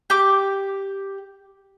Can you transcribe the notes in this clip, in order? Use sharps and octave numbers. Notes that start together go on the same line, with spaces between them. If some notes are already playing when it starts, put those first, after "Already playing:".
G4 D6